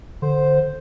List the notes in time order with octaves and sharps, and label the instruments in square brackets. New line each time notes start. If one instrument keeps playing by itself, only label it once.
[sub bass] D3 [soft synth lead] C5